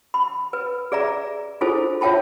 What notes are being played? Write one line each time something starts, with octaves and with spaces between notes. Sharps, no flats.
B5
B4
G#4 D5 E5 A#5
D4 E4 F4 G#4 A4 C5
F4 C#5 E5 G5 A5 B5